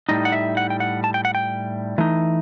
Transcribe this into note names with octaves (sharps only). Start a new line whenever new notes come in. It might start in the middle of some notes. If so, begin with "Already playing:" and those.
A2 G3 D#4 D#5
F#5
E5
F#5
G5
F#5
A5
G5
F#5
G5
E3 A3 D#4